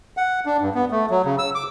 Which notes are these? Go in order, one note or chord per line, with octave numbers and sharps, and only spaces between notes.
F#5
D4
G2
B3
A3
F#3
C#3
E6
D6